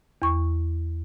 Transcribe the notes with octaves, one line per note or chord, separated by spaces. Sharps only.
E2 C#6